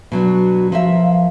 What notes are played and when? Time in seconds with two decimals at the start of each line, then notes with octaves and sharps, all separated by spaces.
0.12 B2 F#3 D4 F#4
0.72 F3 A#4 E5 F5